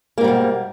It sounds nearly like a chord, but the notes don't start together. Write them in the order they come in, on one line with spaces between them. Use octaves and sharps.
A#3 G#2 G3 B2